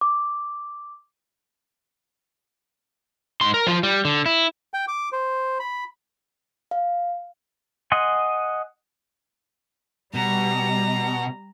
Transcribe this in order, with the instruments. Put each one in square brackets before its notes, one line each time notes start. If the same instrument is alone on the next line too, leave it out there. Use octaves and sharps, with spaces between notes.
[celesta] D6
[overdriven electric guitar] G#2 C6
A#4
F3 F4
G3
D3
E4
[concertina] G5
D6
C5
B5
[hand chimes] F5
[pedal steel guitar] D#5 F#5 G#5 C6
[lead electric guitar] B2 [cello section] G3 [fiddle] A#5